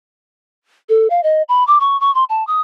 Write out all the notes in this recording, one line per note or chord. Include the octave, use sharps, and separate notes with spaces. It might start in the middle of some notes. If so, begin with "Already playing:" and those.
A4
F5
D#5
B5
D6
C#6
C#6
C6
A5
D#6